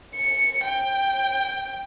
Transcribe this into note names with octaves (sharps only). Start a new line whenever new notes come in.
C#7
G5